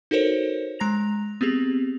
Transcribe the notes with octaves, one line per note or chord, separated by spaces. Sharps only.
D#4 F#4 A4 A#4 C5 C#5
G#3 A#5 A#6 F7
B3 C4 G4 G#4